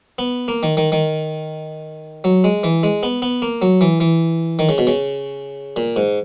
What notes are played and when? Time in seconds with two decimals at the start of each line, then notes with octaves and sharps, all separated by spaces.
0.19 B3
0.48 A#3
0.63 D#3
0.77 D#3
0.92 D#3
2.24 F#3
2.44 G#3
2.63 E3
2.83 G#3
3.03 B3
3.22 B3
3.42 A#3
3.62 F#3
3.81 E3
4.00 E3
4.59 D#3
4.69 C#3
4.78 B2
4.87 C#3
5.76 A#2
5.96 G#2